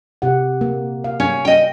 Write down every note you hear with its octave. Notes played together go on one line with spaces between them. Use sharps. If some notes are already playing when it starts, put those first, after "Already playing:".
C3 G4 F#5
A#3
F5
C#4
D#5 G5